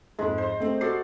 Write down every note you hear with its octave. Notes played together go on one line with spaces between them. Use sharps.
F2 G#2 G#3
C5
A3 C4
F#4 A4 D5 C7